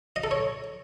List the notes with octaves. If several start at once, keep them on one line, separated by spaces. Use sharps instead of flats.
D#5
A4
C#5